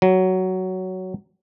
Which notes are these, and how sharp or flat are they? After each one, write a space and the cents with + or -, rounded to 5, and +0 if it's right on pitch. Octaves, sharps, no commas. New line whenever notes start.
F#3 +10